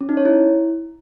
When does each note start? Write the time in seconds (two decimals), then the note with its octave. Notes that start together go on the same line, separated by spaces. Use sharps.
0.01 C#4
0.09 D#4
0.17 C#5
0.25 E4